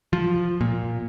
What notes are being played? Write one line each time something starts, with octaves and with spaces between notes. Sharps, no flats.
F3
A#2